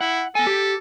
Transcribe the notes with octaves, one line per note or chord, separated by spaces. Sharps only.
E4 F#5
B3 A4 G#5
G4